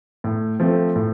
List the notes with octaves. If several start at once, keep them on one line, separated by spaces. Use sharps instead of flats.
A2
F3 A3 C4
A2